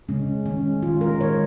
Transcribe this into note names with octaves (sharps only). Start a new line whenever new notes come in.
C#3 G#3 C#4
D#3 G#3 C#4
D#3 G#3 F4
A#4
D#3 G#3 C#5